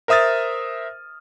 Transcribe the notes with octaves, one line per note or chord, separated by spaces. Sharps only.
A#4 C5 E5 D#6 F6 A6